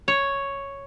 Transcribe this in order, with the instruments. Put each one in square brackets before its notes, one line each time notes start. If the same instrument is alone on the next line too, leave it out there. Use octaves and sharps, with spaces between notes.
[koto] C#5